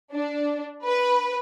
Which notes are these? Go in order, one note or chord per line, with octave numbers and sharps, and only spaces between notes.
D4
B4